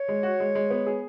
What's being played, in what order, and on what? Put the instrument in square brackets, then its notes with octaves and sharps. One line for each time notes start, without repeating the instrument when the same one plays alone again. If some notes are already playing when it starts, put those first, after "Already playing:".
Already playing: [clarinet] C#5
[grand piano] G#3
F#4
G#3
G#3
B3
G#4